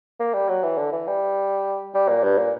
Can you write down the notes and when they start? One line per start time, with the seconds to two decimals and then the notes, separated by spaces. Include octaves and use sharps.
0.20 A#3
0.34 G3
0.49 F#3
0.63 E3
0.78 D3
0.92 E3
1.07 G3
1.94 G3
2.09 A#2
2.24 G2
2.38 A#2